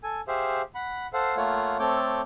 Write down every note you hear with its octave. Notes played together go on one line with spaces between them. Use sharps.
A4 G#5
G4 G#4 C5 E5 F5
F#5 B5
A4 C5 F5 F#5
A3 A#3 F4 C#5 F#5
A3 C4 A4 C#5 D6 G6